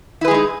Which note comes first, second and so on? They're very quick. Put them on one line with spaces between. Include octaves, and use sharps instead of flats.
E4 B4 G#4 G#3 D#4